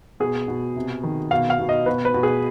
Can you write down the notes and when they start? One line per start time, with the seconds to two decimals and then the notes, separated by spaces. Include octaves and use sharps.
0.20 B2 G#4
0.48 B2
0.76 C3
1.03 D#3
1.31 B2 F5
1.50 F5
1.59 B2
1.69 D#5
1.86 B2 B4
2.05 B4
2.14 B2
2.23 G#4